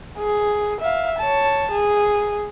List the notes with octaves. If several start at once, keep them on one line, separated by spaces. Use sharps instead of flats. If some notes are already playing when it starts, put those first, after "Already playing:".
G#4
E5 F5
C#5 A5
G#4